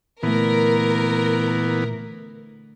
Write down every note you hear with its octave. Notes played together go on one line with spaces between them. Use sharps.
A#2 D3 E3 A3 B3 A#4